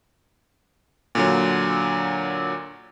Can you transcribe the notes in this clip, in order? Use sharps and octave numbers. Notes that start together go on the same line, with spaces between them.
A#2 D3 F#3